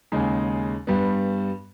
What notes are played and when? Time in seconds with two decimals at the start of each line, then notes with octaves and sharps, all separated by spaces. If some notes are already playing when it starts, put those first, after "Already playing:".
0.12 D#2 C#3 G#3 D#4
0.87 G2 G3 B3